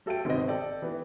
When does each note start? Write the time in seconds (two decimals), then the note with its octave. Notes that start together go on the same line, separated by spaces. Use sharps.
0.06 F#3 A4 E5 G5 D7
0.25 G#1 C3 B3 C4 D#5
0.48 A4 D5 G5
0.82 E3 B3